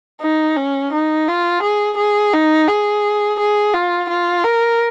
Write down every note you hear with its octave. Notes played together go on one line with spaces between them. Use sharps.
D#4
C#4
D#4
F4
G#4
G#4
D#4
G#4
G#4
F4
F4
A#4